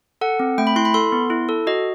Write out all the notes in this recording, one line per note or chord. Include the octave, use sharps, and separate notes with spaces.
A4 F#5
C4
A3 G5
B5
E4 C6
B5
A4 C6
B3
E4
A4
F#4 D#5